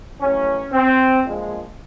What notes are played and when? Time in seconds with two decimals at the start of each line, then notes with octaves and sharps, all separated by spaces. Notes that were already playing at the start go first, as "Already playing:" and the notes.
0.21 A1 A2 F#3 C#4
0.72 C4
1.24 A#1 A#2 F3 G#3